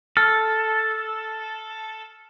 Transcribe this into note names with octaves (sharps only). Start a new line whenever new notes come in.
A4 F6